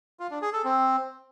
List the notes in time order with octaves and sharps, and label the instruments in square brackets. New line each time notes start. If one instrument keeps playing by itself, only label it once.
[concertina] F4
D4
G#4
A4
C4